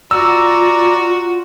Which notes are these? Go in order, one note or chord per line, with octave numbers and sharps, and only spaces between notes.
F4 F#4 D5 A#5 E6